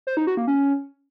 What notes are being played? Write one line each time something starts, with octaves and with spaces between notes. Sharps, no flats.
C5
D#4
F#4
A#3
C#4